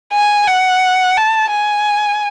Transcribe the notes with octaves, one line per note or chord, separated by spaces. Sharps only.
G#5
F#5
A5
G#5